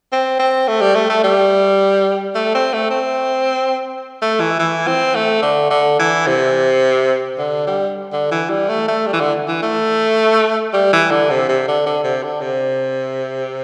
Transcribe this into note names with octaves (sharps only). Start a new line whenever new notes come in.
C4
C4
A3
G3
A3
A3
G3
A3
C4
A3
C4
A3
E3
E3
C4
A3
D3
D3
E3
C3
D3
G3
D3
E3
G3
A3
A3
G3
E3
D3
E3
A3
G3
E3
D3
C3
C3
D3
D3
C3
D3
C3